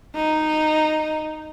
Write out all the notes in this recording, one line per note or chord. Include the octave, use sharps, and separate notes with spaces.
D#4